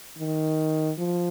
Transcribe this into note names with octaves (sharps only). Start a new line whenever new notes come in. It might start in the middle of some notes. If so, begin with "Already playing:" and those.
D#3
F3